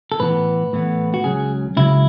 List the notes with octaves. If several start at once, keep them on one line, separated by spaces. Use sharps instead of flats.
A4
A2 E3 B3 B4
A2 E3 B3
F#4
C#2 C#3 F#3 G#4
C#2 C#3 F#3 E4